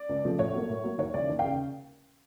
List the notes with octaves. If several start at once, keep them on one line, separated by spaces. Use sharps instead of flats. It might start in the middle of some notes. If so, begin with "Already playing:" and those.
Already playing: D5
C#2
C#3 F3 A3
A2 C#5
F#3 A#3
A2
F#3 A#3
D#2 C#5
C#3 E3 D5
D#2
F5 G5
C#3